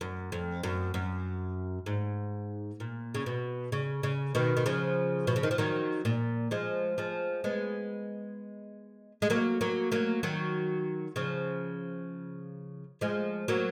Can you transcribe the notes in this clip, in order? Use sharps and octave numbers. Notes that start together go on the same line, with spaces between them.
F#2
F2
F#2
F#2
G#2
A#2
C#3
B2
C#3
C#3
B2 D#3
D#3
C#3 F3
B2
C#3
D#3
F3
D#3 F#3
A#2
F3 G#3
F3 G#3
G#3 B3
G#3
F#3 A#3
F#3 A#3
F#3 A#3
D#3 F#3
C#3 F3
F3 G#3
F#3 A#3